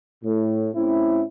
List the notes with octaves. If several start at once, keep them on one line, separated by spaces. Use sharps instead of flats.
A2
A2 C4 C#4 E4